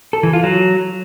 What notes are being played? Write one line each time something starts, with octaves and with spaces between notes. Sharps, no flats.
A4
E3
F4
F#3